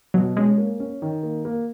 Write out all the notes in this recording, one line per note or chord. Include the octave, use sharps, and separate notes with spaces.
B2 F#3
G#3 C#4
A#3
C#4
D#3
A#3
A#3